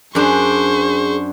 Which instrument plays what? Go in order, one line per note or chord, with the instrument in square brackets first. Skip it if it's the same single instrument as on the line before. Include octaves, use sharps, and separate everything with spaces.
[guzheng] F#2 D4 [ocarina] G#4 [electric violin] C5 C#6